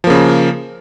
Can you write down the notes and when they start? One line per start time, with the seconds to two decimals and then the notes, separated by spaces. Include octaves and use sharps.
0.04 F3
0.07 A#3
0.10 C#3